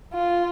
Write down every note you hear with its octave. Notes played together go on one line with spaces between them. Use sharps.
F4